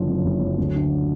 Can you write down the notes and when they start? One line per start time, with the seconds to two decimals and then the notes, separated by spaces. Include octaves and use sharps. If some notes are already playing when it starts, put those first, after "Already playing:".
Already playing: F#1 D3 F3
0.09 F#2
0.25 F#1
0.41 F#2
0.58 D2
0.74 D3